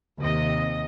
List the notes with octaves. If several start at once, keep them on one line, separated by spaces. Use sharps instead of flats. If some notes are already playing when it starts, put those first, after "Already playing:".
D#2 C3 D#5